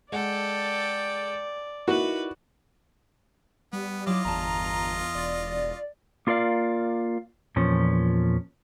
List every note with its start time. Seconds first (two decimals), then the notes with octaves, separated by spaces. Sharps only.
0.12 G#3 A4 D5 F#5 G5
1.88 D#4 E4 F#4 A#4 B4
3.73 G3 B3
4.07 F#3 E4 F4 D#5 D6
4.25 G1 E2 A5 A#5
5.15 E1 D5
6.27 A#3 F4 A#4 D5 F5
7.56 E2 A#2 F3 C#4